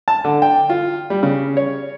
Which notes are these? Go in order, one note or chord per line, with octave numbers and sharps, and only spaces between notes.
A5
D3
G5
F4
G3
C#3
C#5